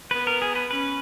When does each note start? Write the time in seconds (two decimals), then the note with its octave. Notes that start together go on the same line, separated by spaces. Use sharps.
0.11 B3 B4
0.27 A#4
0.42 G#4
0.55 B4
0.71 C#4 B4